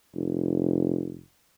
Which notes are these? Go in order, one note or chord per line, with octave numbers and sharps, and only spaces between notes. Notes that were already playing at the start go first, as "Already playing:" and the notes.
F1